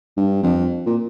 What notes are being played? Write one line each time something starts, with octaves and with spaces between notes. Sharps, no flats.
G2
F2
A#2